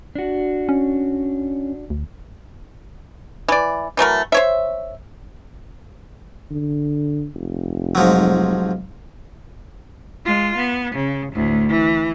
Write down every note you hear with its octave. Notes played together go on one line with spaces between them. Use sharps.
D4 F#4
C#4
D2
E3 D5
E3 F#3 A3 A#4
C5 C#5 E5
D3
F1
G#2 F3 F#3
G#3 F4
B3
C#3
D2 A2
E3